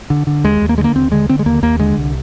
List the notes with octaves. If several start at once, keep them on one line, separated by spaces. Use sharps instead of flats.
D3
D3
D#2 G#3
D#2
A#3
D3 G#3
A#3
D#2 C4
D3 G#3
D3 C4
G#3
D#2 A#3
D#2 A#3
D3 G#3
C2